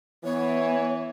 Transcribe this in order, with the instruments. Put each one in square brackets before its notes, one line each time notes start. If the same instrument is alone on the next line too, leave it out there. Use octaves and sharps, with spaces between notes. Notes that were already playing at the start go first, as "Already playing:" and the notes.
[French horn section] E3 [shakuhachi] B3 [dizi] C#5